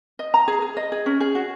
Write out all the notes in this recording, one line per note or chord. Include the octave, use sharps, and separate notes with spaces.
D#5
A#5
G#4
G#4
D#5
G#4
C#4
G#4
F#4